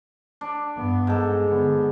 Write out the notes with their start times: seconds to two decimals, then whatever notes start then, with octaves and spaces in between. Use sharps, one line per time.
0.41 D4
0.76 G2 B3
1.07 G#2 A4
1.44 D3 B3